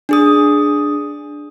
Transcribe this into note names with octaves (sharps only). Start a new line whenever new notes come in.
D4 G#4 D#6